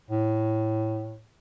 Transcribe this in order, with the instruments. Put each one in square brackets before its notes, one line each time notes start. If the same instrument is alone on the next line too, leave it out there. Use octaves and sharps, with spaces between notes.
[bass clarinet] A2